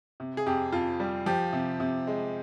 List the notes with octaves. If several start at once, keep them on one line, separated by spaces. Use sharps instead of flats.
C3
G#4
F2 G4
F2 F4
G3
F3 G4
C3
C3
G#3